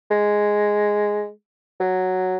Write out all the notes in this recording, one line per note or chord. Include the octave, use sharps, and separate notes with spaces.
G#3
F#3